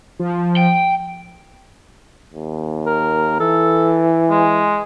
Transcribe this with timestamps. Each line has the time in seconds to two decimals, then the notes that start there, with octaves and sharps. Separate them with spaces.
0.19 F3
0.56 G5
2.33 D#2
2.86 A#4
3.40 E3 A4
4.30 G#3